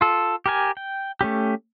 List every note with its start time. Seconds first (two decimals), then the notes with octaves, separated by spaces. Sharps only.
0.01 F4 A4
0.46 G4 A#4 G#5
0.77 G5
1.21 A3 C#4 G4